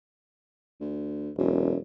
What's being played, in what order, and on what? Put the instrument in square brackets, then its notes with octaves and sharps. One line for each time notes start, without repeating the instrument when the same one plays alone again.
[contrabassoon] D2
[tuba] E1 [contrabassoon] F#2